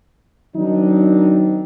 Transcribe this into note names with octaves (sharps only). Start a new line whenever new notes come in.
D#3 F#3 C4 D4 D#4